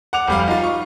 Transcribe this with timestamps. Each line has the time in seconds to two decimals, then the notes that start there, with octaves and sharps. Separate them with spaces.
0.13 F#5 D6 F7
0.28 F1 G3 F5
0.48 D#4 F4
0.63 C#6